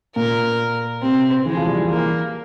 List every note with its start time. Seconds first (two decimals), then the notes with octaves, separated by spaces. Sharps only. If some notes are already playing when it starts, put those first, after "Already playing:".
0.16 A#2 A#4
1.02 C3 C4
1.46 E3 G#3
1.57 F3
1.67 G3
1.78 E3
1.90 A#3